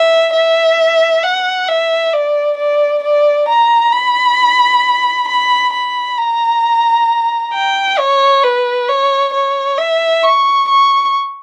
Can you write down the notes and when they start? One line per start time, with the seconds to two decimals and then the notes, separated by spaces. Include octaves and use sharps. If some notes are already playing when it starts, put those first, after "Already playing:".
Already playing: E5
0.33 E5
1.23 F#5
1.68 E5
2.13 D5
2.57 D5
3.03 D5
3.48 A#5
3.93 B5
5.28 B5
5.73 B5
6.18 A#5
7.53 G5
7.98 C#5
8.43 B4
8.88 C#5
9.33 C#5
9.78 E5
10.23 C#6
10.68 C#6